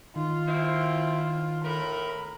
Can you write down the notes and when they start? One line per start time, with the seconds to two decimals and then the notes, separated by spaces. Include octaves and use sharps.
0.16 D#3 F4
0.48 B2 C4 E4
1.64 A2 A#4 B5